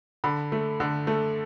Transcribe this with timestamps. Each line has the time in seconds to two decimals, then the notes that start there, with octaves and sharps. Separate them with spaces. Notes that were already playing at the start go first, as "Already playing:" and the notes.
0.24 D3 B5
0.52 A3
0.80 D3
1.07 A3